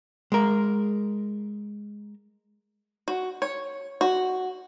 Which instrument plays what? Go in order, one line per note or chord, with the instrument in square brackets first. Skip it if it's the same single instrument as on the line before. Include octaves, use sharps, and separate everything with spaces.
[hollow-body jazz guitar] G#3 A#4
[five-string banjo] F#4
C#5
F#4